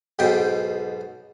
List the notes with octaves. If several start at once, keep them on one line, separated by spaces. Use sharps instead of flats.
B1 G#2 B2 G5